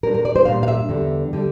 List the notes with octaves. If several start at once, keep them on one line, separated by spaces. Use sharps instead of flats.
A#2 G3 D4 A#4
A#4
D5
C5
A#2 G3 D4 F5
F5
E5
E2 D3 G3
D3 G3